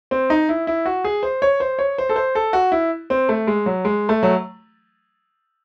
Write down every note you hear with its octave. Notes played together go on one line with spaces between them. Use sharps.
C4
D#4
E4
E4
F#4
G#4
C5
C#5
C5
C#5
C5
A4
C5
A4
F#4
E4
C4
A3
G#3
F#3
G#3
A3
F#3